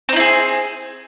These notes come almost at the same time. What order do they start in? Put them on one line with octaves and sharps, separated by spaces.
C4 D#4 E4 G#4